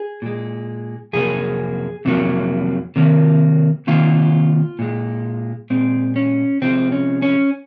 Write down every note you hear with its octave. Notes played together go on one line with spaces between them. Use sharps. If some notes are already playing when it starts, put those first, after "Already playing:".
Already playing: G#4
A#2 G#3
F2 C3 F#3 A#3 G#4
F2 C3 F#3 A#3
C3 D#3 A#3
C3 D#3 A#3 F4
A#2 G#3
A#2 G#3 C4
C#4
C3 F3 G#3 C4
C#4
C#4